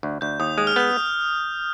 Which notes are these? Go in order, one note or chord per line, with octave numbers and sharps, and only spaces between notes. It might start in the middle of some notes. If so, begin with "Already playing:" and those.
D2
D2 G6
D#2 D#6
G#3 D#6
F6
B3 G6